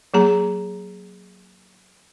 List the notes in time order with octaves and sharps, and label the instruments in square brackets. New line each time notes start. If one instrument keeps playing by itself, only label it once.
[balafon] F#3 A#3 G#4 A#5